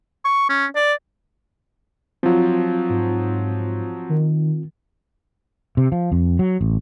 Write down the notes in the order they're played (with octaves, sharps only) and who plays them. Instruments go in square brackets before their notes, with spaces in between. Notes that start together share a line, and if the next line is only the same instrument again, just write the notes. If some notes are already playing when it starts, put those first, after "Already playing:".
[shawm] C#6
C#4
D5
[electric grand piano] F3 F#3 [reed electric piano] C4 F4
[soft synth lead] G#2
D#3
[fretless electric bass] C3
F3
F2
F#3
A1